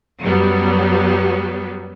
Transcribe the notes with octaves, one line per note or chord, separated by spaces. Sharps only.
F#2 F#3 G3 B3